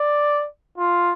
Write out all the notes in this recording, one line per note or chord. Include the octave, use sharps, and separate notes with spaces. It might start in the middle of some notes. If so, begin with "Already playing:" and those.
Already playing: D5
F4